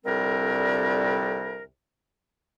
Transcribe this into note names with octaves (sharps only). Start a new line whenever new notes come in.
C2 F2 D3 G3 C4 A#4